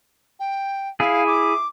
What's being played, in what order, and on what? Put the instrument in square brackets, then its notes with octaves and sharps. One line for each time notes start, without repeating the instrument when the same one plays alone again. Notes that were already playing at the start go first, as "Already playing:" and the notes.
[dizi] G5
[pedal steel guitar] E4 G#4 [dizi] F5
[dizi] D6